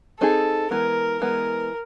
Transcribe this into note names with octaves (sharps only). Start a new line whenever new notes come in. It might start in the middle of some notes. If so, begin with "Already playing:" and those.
C4 D#4 G#4 A4
E3 G#3 B3 A#4
E3 G#3 B3 A#4